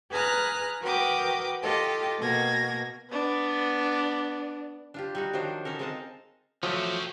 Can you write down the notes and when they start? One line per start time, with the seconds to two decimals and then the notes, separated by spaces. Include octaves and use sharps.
0.12 G#4 B4 A#5 F6 F#6
0.83 F#4 A#4 B4 G5 D6 D#6
1.62 F4 G4 A4 D#5
2.20 B2 A#3 G#6 A#6
3.12 B3 D4
4.94 D4 F4 G4
5.15 G3 D#4 F#4
5.33 D#3 F3 F#3 D4 C5
5.65 C#4 D#4 A4 A#4
5.79 G#3 C4 A#4 D#5 F5 A5
6.63 F3 F#3 A3 C#4 G4